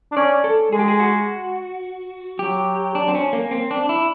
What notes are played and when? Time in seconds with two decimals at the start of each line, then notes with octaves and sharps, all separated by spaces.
0.12 D4
0.16 C#4 D5
0.44 A4
0.72 G#3 G#4
0.79 G4
0.88 G#4
1.00 F#4
2.39 F#3 G4
2.95 D4
3.08 C4
3.15 C#4
3.33 A#3
3.51 C4
3.71 D4
3.89 E4